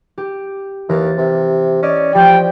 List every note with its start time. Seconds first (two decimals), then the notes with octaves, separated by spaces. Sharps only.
0.18 G4
0.89 D#2 E3 F6 A6
1.18 C3
1.83 C#4 D5 D#5 C#7
2.15 F3 G3 C5 G5